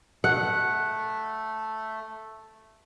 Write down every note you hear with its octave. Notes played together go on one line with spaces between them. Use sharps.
A3 F#5